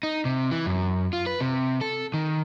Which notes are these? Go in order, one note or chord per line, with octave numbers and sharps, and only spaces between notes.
D#4
C3
E3
F#2
F4
B4
C3
A4
D#3